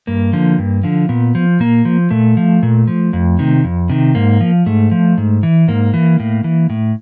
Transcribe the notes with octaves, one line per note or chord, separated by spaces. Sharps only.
G2 A#3
D3 F3
G2
D3 F3
A#2 B3
F3
A#2 A#3
F3
A#2 A3
F3
A#2
F3
F2
C3 D#3
F2
C3 D#3
G#2 A#3
F3
G#2 A3
F3
G#2
E3
G#2 A#3
E3
A2
E3
A2